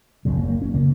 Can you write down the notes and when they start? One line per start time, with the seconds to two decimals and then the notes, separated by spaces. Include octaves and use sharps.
0.25 F#1 F#2 C#3 F#3
0.37 A#3
0.48 A#3
0.62 C#4
0.74 C#3 A#3